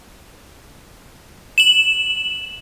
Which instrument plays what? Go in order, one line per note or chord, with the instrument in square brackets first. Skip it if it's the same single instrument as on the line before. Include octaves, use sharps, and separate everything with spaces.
[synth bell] E7 F#7